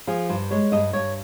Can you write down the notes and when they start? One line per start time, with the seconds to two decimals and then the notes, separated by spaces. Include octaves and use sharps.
0.07 F3 G#4
0.29 G2 C5
0.51 G#3 C#5
0.72 G2 D#5
0.93 G2 C#5